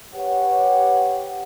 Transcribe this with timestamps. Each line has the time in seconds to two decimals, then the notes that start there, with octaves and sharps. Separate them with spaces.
0.15 G4 B4 C#5 F#5